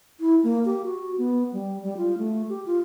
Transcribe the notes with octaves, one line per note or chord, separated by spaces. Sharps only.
E4
A#3
G4
F#4
B3
G3
G3
F4
A3
G4
F4